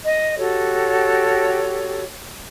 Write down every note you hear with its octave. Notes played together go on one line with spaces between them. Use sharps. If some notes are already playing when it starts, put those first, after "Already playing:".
D#5
F#4 G4 A4 C#5